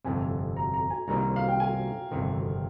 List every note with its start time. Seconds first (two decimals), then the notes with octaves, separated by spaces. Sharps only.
0.05 G1 F2 C3 G#5
0.57 A#5
0.74 A#5
0.90 G#5
1.08 C2 C3 D#3 G3 A#3 A#5
1.36 F5
1.48 G5
1.60 G#5
2.11 G1 F2 C3 D#3